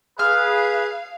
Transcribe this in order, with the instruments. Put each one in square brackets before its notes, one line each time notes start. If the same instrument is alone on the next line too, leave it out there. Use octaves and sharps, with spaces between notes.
[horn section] G#4 [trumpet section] B4 [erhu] F5 [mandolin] F6